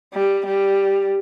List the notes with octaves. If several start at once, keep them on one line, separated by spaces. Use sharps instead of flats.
G3
G3